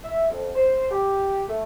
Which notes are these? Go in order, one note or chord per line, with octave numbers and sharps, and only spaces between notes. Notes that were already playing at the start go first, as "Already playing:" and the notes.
E5
F2
C5
G4
A3